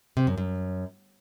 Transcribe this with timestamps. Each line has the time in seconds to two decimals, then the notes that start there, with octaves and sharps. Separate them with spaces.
0.17 C3
0.27 F#2
0.38 F#2